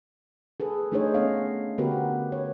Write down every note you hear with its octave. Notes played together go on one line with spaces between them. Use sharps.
G#4 A4 B4
A3 D4 D#4 G#4 C5 C#5
B3 C#4 C#5 D#5 F5
D3 B3 F#4 G4 A#4 B4
C#5